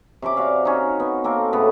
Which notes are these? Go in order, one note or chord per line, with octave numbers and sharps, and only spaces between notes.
C3 C#4 B5 D6
F#4 D5 F5
C#4 D#4
B3
A#3 C4 A4 A#4
A2 C#3 B3 B5